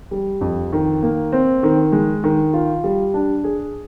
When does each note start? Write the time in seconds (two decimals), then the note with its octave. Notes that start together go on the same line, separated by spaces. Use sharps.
0.11 G3
0.41 F2
0.72 D#3
1.03 A#3
1.32 C4
1.63 D#3
1.92 G#3
2.24 D#3
2.53 F4
2.84 G3
3.14 D4
3.44 G#4